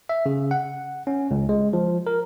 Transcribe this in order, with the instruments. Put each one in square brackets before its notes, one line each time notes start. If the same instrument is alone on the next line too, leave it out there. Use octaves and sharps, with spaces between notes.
[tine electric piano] E5
C#3
F#5
C#4
C#2
G#3
F3
A#4